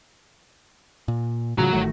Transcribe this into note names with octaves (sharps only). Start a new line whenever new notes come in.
A#2
A2 C#3 F3 F#4 A#5
A1 D#3 A3